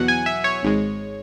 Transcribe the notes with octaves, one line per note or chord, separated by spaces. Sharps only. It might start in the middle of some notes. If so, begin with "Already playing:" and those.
Already playing: E2 B2 F#3 F#5
G#5
E5
C#5
G#1 G#2 G#3